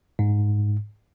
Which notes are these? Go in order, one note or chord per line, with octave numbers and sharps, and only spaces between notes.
G#2